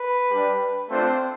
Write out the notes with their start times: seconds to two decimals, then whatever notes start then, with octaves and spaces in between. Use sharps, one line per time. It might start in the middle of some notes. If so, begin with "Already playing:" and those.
Already playing: B4
0.30 G3 D4 G4
0.90 A3 C4 D4 F4 C5